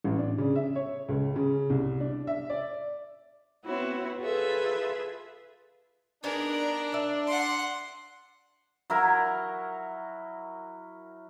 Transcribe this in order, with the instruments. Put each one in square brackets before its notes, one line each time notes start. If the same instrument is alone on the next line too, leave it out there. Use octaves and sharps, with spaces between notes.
[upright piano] A1
D4
C#3
E5
C#5
C#2
C#3
C2
D4
E5
D5
[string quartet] B3 C4 E4 F#4 C#5
F4 G#4 A4 B4 E5
[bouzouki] B3 D#4 G#4 [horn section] D4 [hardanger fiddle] A#4
[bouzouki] D5 E5
[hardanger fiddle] F#5 C6
[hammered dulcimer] F#3 E4 A#4